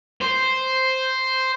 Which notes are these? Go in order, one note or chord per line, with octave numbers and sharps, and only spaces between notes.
C5